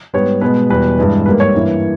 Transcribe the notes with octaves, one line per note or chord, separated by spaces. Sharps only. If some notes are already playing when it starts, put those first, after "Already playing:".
G#2 G3 B3 C#5
B2 G#3 B3 B4
E2 B2 G3 B4
G2 E3 G#3 B3
G#2 G3 A#3 B4
C#5
G2 E3 A#3